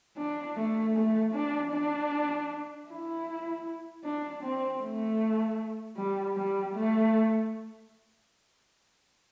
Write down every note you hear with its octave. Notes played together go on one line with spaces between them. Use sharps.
D4
A3
A3
D4
D4
E4
D4
C4
A3
G3
G3
A3